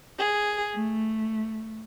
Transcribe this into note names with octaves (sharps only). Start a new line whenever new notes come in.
G#4
A3